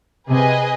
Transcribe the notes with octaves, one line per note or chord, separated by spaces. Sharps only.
C3 G#4 B4 D#5 G#5